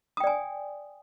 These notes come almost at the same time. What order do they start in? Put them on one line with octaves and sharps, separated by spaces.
D#6 G5 D5 G#5